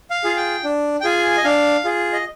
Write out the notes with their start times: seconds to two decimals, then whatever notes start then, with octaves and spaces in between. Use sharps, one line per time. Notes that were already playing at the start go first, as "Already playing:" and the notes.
0.10 F5
0.24 F4 G#4
0.37 G5
0.64 D4
1.01 G5
1.04 F4 G#4 G#5
1.37 D#5
1.44 D4 F5
1.84 F4 G#4
2.13 D#5